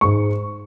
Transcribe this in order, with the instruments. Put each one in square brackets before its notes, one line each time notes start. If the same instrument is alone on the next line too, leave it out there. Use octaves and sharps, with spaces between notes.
[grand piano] G#2 G#3 C#6